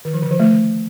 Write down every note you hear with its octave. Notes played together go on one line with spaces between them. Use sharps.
D#3
F3
D3
F3
A3